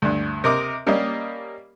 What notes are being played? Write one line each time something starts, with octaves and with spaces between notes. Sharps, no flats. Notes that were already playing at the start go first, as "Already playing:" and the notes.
D2 G2
C3 A#4 D#5 D6
G3 A#3 C#4 G4 D5 D#5